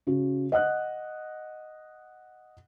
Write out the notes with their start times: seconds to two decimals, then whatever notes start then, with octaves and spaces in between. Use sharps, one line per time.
0.07 C#3 F#4
0.52 D#5 F#5 F#6